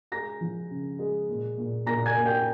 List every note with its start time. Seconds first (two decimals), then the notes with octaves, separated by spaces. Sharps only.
0.12 G#3 A#5 A#6
0.41 F3
0.70 C#3
0.99 G#3
1.29 A#2
1.58 A#2
1.86 A#2 A#5 A#6
2.06 G#5 G#6
2.16 A#3
2.26 G5 G6